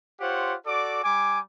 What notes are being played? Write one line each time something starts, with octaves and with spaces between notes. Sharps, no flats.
F4 G4 C5 C#5 F#5
F#4 A4 D5 D6
G3 G#5 D6